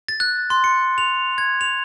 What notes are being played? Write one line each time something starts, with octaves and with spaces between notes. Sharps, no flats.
A6
F#6
C6
C#7
F7
G#6
F7